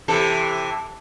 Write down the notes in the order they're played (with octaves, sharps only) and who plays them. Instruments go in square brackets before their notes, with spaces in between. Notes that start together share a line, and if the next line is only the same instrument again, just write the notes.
[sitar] C3 E3 A4